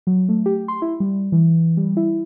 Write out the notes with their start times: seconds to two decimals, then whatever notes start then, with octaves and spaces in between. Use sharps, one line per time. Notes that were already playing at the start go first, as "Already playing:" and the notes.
0.07 F#3
0.29 A3
0.46 G4
0.68 C6
0.82 E4
1.00 G3
1.32 E3
1.77 G3
1.97 E4